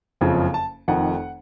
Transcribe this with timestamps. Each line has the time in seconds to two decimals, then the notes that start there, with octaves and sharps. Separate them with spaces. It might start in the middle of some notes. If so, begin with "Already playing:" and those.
0.21 F#1 F2 C#3 F3 C4
0.54 A5
0.88 F1 F2 D#3 F#5